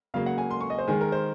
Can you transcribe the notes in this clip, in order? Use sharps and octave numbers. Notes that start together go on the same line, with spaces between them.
C#3 F#3 A#3 F5
F#5
G#5
C6
C#6
D#5
C5
D#3 G#3 G#4
A#4
C5